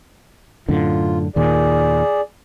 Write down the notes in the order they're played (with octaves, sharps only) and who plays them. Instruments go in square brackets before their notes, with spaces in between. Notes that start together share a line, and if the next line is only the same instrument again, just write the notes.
[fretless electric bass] F#2 A2 D3 [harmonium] F4
[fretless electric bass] D#2 A#2 D#3 [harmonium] G#4 D5